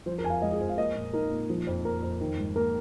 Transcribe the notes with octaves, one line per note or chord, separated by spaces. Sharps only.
F3 C5
A#4
F2 G#5
F5
G#3 D#5
G#4
F2 C5
F5
A#3 D#5
A#2
D#4 A#4
A#2
F3
F2
A#3 A#4
F2
D#3
G#2
A#3 A#4